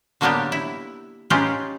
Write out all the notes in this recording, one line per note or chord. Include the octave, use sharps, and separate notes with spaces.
D3 F#3 A#3 B3 D4 G4
E4
C#4 D#4 F4 G4 G#4 B4